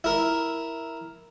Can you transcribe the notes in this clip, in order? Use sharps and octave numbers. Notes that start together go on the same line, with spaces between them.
E4 A#4